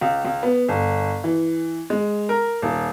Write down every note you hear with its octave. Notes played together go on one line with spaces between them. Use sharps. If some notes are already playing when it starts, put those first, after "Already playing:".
C#2
C#2
B3
G1
E3
G#3
A#4
D#1